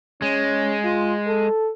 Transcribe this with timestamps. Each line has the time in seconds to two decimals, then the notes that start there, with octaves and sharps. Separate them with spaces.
0.22 G#3 C#4
0.84 F4
1.28 A4